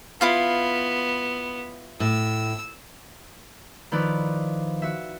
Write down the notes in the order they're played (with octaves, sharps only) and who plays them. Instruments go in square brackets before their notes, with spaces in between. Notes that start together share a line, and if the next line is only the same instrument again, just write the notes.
[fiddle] B3 [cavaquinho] E4 F4 F5
[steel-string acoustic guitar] A2 [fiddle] E6
[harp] D#3 F3 E4 B4 D5
F#4 E5